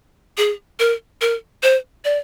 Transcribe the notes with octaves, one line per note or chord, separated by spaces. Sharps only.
G#4
A#4
A#4
C5
D5